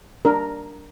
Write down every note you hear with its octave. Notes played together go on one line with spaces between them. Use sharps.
D4 A#4